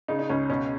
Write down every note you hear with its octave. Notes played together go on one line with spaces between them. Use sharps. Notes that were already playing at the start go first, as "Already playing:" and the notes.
C#3 D#4
D#4
C#2 C#4
B2 C#4